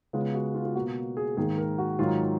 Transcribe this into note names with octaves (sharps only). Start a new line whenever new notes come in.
C#3 G#3 B3 F4
F#4
F4
F4
B2 A#3 F#4
G#4
G#2 D#3 A#3 G#4
A#4
F#4
G#2 D#3 F#3 F4